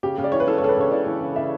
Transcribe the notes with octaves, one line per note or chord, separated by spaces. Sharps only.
C#3 G4
C#3
D5
E3 C#5
B4
E3 A4
C#5
C#3 A4
B4
C#3 C#5
E3 D5
E3
C#3
C#3 E5